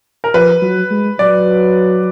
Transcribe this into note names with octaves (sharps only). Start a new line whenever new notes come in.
A#4
F3 B4
F#3
G#3
F#3 D5